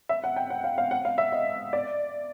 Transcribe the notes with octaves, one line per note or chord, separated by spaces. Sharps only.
E5
F#5
G5
F#5
F5
F5
F#5
F5
E5
D#5
D5